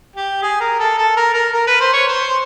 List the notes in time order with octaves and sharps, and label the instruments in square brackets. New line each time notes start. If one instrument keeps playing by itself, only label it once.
[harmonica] G4
G#4
A#4
A4
A4
A#4
A#4
A#4
B4
C5
C#5
C5